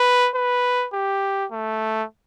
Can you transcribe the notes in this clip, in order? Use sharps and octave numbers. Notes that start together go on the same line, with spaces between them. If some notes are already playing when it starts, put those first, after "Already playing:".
Already playing: B4
B4
G4
A3